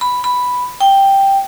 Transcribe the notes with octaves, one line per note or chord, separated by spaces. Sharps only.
B5
B5
G5